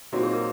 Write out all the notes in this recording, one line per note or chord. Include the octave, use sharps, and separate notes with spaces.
A#2 F#3 C4 D#4 F#4
G#4
A#4